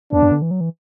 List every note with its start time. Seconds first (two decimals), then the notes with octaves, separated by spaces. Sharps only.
0.12 E2 B3 D4
0.22 F#2
0.32 D3
0.42 E3
0.51 F#3
0.61 E3